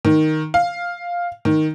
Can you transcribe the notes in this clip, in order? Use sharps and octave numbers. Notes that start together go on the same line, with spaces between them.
D#3
F5
D#3